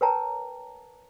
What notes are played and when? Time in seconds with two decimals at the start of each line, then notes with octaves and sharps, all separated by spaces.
0.01 A#4 B4 C#5 G5 A5 A#5